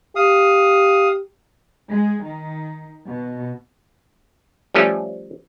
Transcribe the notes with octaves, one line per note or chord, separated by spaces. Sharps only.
G4 F5 D#6
G#3
D#3
B2
F3 G3 A3 C#4